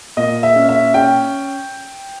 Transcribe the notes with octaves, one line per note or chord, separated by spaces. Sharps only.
A#2 D#5
E5
C#4
E5
C#4 G5